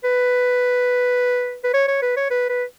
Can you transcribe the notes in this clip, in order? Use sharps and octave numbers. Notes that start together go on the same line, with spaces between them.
B4
B4
C#5
C#5
B4
C#5
B4
B4